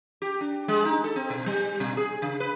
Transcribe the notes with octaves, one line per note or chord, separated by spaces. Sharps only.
G4
D4
G#3
D#4
A4
C4
B2
G3
B2
G#4
C#3
B4